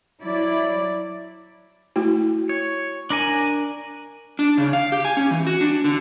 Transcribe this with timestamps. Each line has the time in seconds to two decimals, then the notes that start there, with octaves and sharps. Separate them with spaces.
0.23 F#3 E4 D5
1.96 A3 E4 F#4
2.49 C#5
3.10 D4 A#4 G#5
4.39 D4
4.58 C#3
4.73 F5
4.92 G4
5.05 G#5
5.17 C#4
5.31 E3
5.47 F#4
5.61 D4
5.84 D3